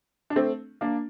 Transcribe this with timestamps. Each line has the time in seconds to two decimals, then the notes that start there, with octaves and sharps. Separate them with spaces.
0.30 D4
0.36 A3 C4
0.81 A#3 D4